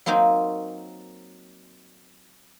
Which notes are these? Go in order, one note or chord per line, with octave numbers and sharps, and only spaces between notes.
F#3 A#3 C4 D#4 C5